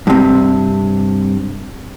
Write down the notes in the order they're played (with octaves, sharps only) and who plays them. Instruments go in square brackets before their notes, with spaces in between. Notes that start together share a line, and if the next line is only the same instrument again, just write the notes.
[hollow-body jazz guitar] G2 C3